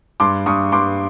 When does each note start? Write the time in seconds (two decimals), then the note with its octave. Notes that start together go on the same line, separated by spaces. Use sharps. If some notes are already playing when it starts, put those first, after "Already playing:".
0.20 G2 C6 D6
0.46 G2 C#6 D#6
0.72 G2 C6 D6